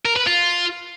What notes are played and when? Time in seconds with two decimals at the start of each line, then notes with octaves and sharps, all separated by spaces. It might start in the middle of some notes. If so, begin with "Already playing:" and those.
0.05 A#4
0.16 B4
0.27 F4